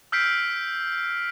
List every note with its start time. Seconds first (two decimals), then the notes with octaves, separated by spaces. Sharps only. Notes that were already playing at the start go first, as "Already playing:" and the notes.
0.12 E6 F6 G6 B6 C7 D7